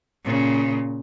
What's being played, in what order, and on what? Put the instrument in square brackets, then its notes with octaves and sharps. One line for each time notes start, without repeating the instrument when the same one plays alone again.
[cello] A#2 C#3